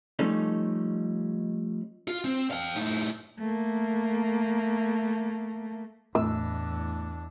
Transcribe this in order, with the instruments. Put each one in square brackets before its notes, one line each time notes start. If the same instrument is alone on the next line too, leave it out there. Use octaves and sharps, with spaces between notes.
[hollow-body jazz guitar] F3 G3 A3 C#4 D#4
[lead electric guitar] F4
C4
F5 G5
A2 D#4
[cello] A3 A#3
[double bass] E2 D4 [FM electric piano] A2 [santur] E6